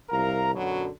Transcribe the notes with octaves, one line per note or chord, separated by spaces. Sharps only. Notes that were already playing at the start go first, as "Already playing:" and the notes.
C2 A#4 F5 A#5
F#2 B2 D3 F#3